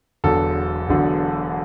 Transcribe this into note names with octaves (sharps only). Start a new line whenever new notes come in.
E1 E2 D3 F#3 A4
E1 E2 D3 F#3